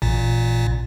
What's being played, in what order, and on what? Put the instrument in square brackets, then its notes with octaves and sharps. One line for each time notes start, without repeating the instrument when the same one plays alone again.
[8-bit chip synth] A1 A#2